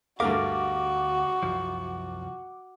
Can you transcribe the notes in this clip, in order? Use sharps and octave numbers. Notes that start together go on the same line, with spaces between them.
D2 G2 A3 F#4 G4 A#4 F5 D6
C2 F#2 F3